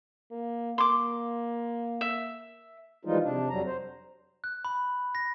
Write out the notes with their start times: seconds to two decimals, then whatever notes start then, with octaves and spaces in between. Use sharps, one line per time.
0.31 A#3
0.78 A#3 C6 D6
2.01 E5
3.05 E3 F3 G3 G#3 D#4 F4
3.22 C3 D4
3.49 F2 F#3 G3 A#5
3.66 C5
4.44 F#6
4.65 B5
5.15 A#6